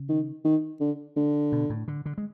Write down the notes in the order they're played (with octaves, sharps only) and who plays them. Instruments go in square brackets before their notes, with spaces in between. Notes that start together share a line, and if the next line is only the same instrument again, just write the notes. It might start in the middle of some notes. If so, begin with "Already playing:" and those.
Already playing: [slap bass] C#3
[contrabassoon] D#3
D#3
D3
D3
[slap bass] B2
A2
D3
D3
G#3